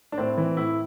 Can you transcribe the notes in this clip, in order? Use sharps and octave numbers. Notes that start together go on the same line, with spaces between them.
D4
A2 C4
E3
A2 E4